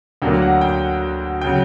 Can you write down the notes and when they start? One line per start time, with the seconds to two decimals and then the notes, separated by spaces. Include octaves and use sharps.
0.22 D2 D3 F#3 A#3 G5
0.42 F#5
0.61 G5
1.41 C#3 F#3 G5